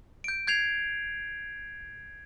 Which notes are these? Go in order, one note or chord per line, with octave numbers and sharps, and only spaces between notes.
G6 D7
G6 G#6 C7 F7